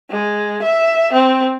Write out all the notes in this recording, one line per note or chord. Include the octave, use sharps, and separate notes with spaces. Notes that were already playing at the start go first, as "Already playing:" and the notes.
G#3
E5
C4